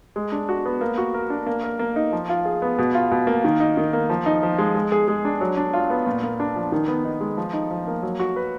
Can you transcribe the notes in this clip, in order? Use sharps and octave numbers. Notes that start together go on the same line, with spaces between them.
G#3
D4
F#4
B3
A#3
F#4
A#4
D4
A#3
A#4
A#3
D#4
F3
F4
G#4
B3
B2
F4
B2
A#3
D#3
D#4
D#3
A#3
F3
D#4
F3
G#3
G#3
G#4
G#3
D4
F#3
D4
F4
B3
A#2
A#3
D4
F3
D#3
B3
D#4
G#3
F3
D#4
F3
A#3
F#3
F#4
B4